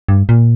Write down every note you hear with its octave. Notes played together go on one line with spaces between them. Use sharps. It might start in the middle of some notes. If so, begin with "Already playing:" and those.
G2
A#2